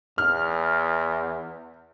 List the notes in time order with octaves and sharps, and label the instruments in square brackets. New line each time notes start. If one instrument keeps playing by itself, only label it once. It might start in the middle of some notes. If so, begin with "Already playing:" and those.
[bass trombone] E2 [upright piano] F6